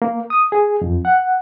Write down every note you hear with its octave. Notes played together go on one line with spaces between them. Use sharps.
A#3
D#6
G#4
F2
F#5